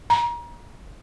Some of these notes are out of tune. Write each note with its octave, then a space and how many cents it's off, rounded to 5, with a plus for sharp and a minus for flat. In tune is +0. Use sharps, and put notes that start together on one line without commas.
A#5 +30